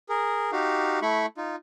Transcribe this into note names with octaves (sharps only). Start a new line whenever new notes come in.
G#4 A#4
D#4 F#4 G4 F5
A3 E4 B5 C#6
D#4 F4